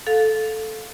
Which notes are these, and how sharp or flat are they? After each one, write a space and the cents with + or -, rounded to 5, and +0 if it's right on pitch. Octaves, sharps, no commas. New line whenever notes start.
A4 -5 F5 +20